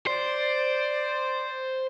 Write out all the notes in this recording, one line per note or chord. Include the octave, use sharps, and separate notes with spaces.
C5 D5